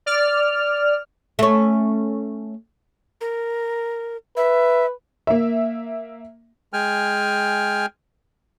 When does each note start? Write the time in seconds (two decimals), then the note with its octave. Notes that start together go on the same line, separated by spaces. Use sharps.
0.06 D5 F6
1.39 A3 C#4
3.21 A#4
4.37 B4 E5
5.27 A#3 E5
6.73 G#3 G5 G#5 F6